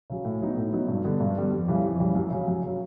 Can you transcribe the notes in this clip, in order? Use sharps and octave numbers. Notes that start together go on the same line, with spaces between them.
C#3 F#3
A2
F#3 B3 D#4
A2
F#3 B3 D#4
G2
D3 G3 B3
G2
D3 G3 B3
F2
C#3 E3 G3
F2
C#3 E3 G3
F#2
C#3 F#3
F#2
C#3
F#3